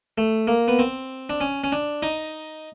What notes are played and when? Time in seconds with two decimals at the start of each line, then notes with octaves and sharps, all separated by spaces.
0.18 A3
0.47 A#3
0.68 B3
0.79 C4
1.30 D4
1.41 C#4
1.64 C#4
1.72 D4
2.03 D#4